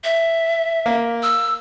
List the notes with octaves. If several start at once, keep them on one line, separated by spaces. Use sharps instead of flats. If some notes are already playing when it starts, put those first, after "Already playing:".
E5
A#3
E6